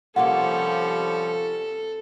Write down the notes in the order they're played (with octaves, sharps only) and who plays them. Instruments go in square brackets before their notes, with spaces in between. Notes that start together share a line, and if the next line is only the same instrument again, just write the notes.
[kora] C3 A#3 F4 [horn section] F3 G3 C#4 [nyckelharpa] A4 [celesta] F#5